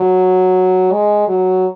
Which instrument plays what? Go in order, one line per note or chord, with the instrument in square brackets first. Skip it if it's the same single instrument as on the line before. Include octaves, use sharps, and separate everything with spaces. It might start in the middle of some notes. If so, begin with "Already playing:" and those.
Already playing: [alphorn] F#3
G#3
F#3